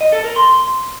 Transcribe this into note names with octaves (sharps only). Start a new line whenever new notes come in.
D#5
A4
A#4
C6